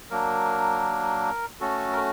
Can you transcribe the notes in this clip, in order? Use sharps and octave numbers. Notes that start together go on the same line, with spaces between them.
F#3 A#3 D4 A#4
A3 C#4 F#4 A4
A#4